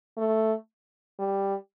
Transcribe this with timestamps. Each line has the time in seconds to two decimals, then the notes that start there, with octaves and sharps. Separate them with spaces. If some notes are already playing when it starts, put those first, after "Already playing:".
0.18 A3
1.19 G3